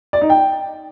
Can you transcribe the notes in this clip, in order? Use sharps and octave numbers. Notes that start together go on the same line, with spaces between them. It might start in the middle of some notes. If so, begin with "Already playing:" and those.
D5
D#4
G5